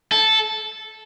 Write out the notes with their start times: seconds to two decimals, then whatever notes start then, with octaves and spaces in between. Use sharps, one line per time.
0.12 A4